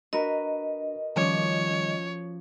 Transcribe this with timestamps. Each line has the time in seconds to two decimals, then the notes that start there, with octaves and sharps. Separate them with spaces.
0.13 D4 F#4 A#4 B4 D#5
1.16 D#3 F3 G3 C#4 C#5 D6